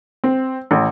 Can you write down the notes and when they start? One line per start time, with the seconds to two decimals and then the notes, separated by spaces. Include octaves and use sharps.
0.24 C4
0.71 A1